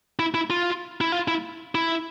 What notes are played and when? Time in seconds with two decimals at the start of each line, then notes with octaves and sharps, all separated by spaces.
0.19 E4
0.34 E4
0.50 F4
1.01 E4
1.12 F4
1.28 E4
1.75 E4